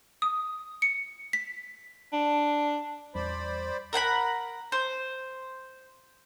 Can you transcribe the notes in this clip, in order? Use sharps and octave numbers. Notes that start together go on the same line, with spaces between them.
D#6
C#7
B6
D4
E2 G3 C5 D5 B5
A#4 F#5 G#5 B5
C5